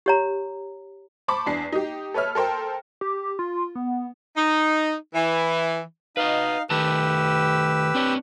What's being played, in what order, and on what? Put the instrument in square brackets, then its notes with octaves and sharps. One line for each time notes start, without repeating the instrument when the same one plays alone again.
[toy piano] G4 C#5 A#5
[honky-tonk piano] C5 A5 B5 C#6 D6
E2 D4 C7
D#4 G4
A4 B4 C#5 E5 F6
A4 A#4 C5 G5
[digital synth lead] G4
F4
B3
[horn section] D#4
E3
[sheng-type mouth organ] D#4 F5 [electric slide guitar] B4 D#5
[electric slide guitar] D#3 A3 A5 [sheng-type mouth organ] G4 B4 E6
[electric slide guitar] C4 D4 C#5